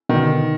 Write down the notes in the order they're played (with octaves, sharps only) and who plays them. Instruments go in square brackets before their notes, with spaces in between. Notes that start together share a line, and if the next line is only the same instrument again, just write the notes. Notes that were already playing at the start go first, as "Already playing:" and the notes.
[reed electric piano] B2 D3 [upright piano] D#3